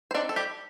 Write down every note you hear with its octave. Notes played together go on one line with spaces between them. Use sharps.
C5
C4 D4 D#4 D5
A4
G3 G4